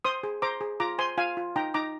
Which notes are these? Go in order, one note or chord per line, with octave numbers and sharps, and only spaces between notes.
C5 C6 D#6
G#4
C5 A#5 D6
G#4
F4 A#5 D6
C5 G#5 C6
F4 F5 G#5
F4
D#4 G5 A#5
D#4 A#5 D6